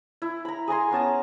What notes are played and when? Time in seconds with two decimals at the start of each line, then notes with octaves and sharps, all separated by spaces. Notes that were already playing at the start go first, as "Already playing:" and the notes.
0.22 E4
0.45 A#5 B5
0.68 G#4 G#5 A#5 C6
0.91 B3 C#4 A5 A#5